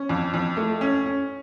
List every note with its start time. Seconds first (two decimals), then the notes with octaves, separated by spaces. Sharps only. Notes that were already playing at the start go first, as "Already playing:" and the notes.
Already playing: C#4
0.09 F2
0.34 F2
0.57 A3
0.81 C#4
1.06 C#4